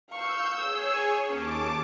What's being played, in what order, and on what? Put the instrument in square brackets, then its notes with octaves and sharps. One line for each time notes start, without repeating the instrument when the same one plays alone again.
[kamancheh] F5 C#6 [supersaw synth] E6 G6
[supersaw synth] G#4 C#5 [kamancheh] E6
[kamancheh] G#5
[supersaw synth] D#2 A5 D6 [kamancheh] C#4